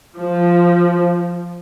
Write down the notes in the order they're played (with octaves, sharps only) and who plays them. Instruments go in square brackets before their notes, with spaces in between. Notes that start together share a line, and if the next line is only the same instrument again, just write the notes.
[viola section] F3